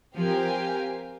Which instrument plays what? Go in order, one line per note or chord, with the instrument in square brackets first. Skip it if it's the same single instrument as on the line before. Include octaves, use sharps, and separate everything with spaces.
[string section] F3 [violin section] C4 G4 A#4 F5 G#5